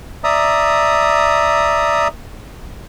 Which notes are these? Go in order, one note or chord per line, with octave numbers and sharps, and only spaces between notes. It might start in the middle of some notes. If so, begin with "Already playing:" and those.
D5 E5 A#5 D#6